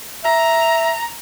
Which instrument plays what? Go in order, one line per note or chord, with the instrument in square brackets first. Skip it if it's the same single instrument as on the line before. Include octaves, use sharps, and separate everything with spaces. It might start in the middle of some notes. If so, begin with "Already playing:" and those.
[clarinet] E5 [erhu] A#5